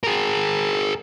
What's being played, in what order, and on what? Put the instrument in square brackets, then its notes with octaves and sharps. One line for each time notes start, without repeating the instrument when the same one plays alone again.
[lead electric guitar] G#4 A#4